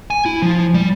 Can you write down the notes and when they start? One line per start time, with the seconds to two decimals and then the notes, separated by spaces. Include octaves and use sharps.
0.10 G#5
0.26 E4
0.42 F3
0.74 G3